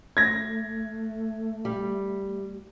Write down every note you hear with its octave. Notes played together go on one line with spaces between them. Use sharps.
A3 G#6 A#6
G3